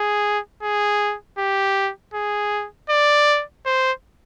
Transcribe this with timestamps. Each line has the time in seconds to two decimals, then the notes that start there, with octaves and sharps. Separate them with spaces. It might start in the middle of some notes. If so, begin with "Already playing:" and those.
Already playing: G#4
0.62 G#4
1.38 G4
2.14 G#4
2.90 D5
3.65 C5